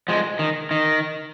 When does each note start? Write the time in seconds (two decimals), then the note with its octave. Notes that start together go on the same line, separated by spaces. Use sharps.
0.08 F3 G#3
0.39 D#3
0.71 D#3